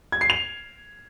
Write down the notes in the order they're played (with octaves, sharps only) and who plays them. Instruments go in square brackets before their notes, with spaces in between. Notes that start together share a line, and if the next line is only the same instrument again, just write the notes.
[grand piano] G#6
C7
F7